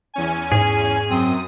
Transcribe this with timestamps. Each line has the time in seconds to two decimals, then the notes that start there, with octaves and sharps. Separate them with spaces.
0.14 E2 C#4 G#5
0.52 G#2 G#4
1.10 F#2 C4 D#6